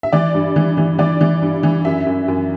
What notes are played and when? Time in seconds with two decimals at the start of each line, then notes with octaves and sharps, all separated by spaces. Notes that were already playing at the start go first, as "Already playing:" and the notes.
0.03 E5
0.13 E3 D5
0.34 G2
0.56 E3
0.77 E3
0.99 E3 D5
1.21 E3
1.42 G2
1.63 E3
1.85 F#2 E5
2.06 F#2
2.28 F#2